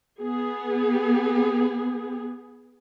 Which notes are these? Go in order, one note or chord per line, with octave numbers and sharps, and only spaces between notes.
B3 G#4